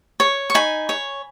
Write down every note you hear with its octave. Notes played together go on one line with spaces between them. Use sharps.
C#5
C#6
D#4 G#5 B5
C#5